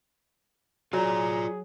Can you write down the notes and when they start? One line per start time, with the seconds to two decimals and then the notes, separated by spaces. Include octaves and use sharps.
0.93 F#3 F4 G#4 D5 A#5